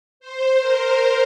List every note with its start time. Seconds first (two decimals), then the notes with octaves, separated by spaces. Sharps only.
0.20 C5
0.60 A#4